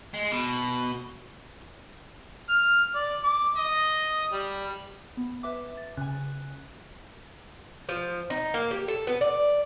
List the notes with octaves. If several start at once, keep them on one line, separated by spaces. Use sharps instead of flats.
G#3
B2
F6
D5
D6
D#5
G3
B3
B4 E5 D6
A6
C#3 G#5 F#6
F3
D#4
A#3
G4
A4
B3
D5